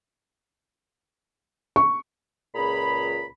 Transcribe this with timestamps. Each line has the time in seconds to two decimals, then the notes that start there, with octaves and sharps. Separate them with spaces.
1.76 C#6
2.55 C#2 A#2 G#4 A#5 B5